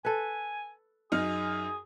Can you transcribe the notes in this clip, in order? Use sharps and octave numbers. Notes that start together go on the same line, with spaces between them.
A4 B4 G#5
F#2 D#4 G#4 F6